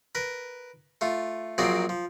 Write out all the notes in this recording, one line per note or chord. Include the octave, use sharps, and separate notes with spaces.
A#4 B4
A3 F4
A#1 F#3 A#3 C4 G#4 D5
F3